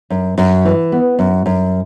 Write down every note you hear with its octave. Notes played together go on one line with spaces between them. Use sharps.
F#2
F#2
E3
B3
F#2
F#2